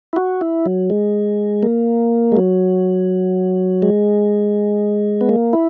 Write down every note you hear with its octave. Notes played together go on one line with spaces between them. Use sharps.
E4
F#4
E4
F#3
G#3
A#3
G#3
F#3
G#3
B3
A#3
E4